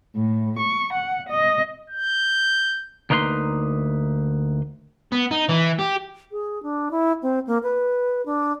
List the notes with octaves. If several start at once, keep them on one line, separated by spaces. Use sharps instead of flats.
A2
C#6
F#5
D#5
G6
D2 A#3 D#4 B4 G5 C6
B3
D#4
E3
G4
G#4
D4
E4
C4
A#3
B4
D4